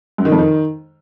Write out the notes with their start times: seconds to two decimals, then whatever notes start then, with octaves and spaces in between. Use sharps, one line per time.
0.18 F#2
0.25 D#3
0.32 F2
0.39 D#3